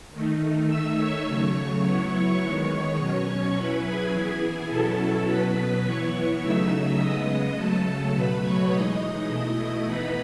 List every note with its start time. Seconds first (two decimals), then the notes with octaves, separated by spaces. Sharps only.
0.11 D#3 A3 D#4
0.68 D#3 A3 D#4 E5 E6
0.97 C#5 C#6
1.26 C#3 F#3 A3 C#5 C#6
1.84 F#3 B3 E4
2.40 D#3 G#3 B3
2.98 B2 F#3 C#4
3.55 F#3 C#4 E4 B4 B5
3.84 G#4 G#5
4.12 E3 B3 E4 G#4 G#5
4.41 G#4 G#5
4.69 B2 F#3 C#4 E4 A4 A5
5.26 B2 F#3 B3 B4 B5
5.84 E3 B3 E4 C#5 C#6
6.41 C#3 F#3 A3 D#4 E5 E6
6.70 E5 E6
6.98 C#3 G#3 B3 D#5 D#6
7.55 C#3 F#3 A3 A4 A5
8.13 B2 F#3 A3 B4 B5
8.42 C#5 C#6
8.70 E3 G#3 D#4 D#5 D#6
9.27 B2 A3 E4 D#5 D#6
9.85 E3 B3 D#4 B4 B5